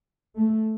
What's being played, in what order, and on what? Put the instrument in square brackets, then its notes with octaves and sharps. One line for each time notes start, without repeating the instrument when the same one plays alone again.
[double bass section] A3